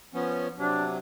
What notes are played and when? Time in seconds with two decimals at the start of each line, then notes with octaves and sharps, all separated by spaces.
0.14 F3 B3 C#4
0.58 C3 F#3 D4